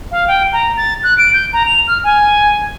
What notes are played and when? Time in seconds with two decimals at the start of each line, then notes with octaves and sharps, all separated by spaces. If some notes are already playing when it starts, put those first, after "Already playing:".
0.11 F5
0.28 G5
0.53 A#5
0.77 A6
1.03 F#6
1.18 D7
1.33 G6
1.53 A#5
1.66 F7
1.88 F6
2.04 G#5